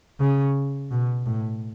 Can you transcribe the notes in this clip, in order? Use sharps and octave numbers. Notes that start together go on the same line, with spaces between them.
C#3
B2
A2